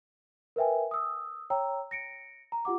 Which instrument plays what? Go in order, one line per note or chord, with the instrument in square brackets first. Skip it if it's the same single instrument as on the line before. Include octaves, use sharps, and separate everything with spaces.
[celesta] A#4 B4 E5 G5 G#5
D#6 E6
C#5 G5 A#5 E6
A#6 C#7 D7
A#5
F4 G4 F#5 D6